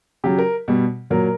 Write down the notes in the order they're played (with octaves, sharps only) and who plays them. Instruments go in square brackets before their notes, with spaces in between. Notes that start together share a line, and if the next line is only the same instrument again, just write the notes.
[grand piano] C#3 F#3 G4
A#4
B2 G3
A#2 F#3 A#4